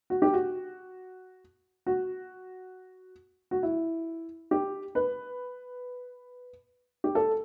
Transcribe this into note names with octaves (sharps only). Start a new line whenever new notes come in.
F#4
G4
F#4
F#4
F#4
E4
G4
B4
G4
A4